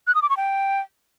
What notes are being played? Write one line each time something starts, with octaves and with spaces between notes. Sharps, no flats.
F#6
D#6
D6
C#6
G5